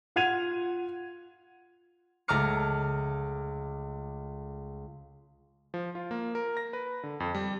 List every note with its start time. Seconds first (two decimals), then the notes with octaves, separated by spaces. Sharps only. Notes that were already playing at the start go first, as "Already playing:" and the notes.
0.16 F4 F#5 G#6 D#7 F7
2.28 C#2 A3 A#5 D6 F6 C#7
5.74 F3
5.95 F4
6.11 A#3
6.35 A#4
6.57 A#6
6.73 B4
7.03 D3
7.20 F2
7.35 G3